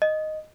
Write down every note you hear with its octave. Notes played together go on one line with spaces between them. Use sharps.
D#5